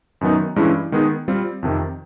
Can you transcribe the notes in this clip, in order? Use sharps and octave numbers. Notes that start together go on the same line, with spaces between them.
F#2 D#3 F#3 B3 D#4
G2 E3 G#3 C#4 E4
D#3 G#3 B3 D#4 G#4
G3 C4 F4
F2 C3 D#3